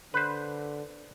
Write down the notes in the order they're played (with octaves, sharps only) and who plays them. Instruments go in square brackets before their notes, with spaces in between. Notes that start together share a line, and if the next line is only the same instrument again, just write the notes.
[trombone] D3 [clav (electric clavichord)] B4 C5